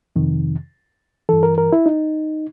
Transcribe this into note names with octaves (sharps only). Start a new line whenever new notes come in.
F2 C3 D#3
G2 E3 A4
A#4
A#4
E4
D#4